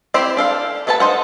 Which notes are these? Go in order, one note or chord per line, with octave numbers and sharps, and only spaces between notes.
C4 E4 G4 C5 E5
D4 A4 F5
A3 A4 B4 F#5 A5
D#4 C5 F#5